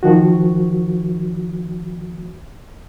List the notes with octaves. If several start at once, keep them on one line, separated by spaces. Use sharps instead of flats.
D#3 F3 F#4